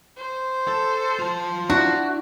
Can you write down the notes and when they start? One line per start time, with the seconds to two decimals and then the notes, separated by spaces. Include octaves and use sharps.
0.17 C5
0.68 A4
1.19 F4 A5
1.70 D4 E4 F#4